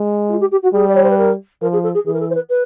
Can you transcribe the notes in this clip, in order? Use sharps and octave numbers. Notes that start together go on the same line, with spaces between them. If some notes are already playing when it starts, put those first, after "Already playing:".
Already playing: G#3
F4
G4
G4
F#4
G3 G#4
D5
C#5
C5
B4
A#4
F3 A#4
G#4
A4
G#4
E3 G#4
A#4
A4
C5
B4
B4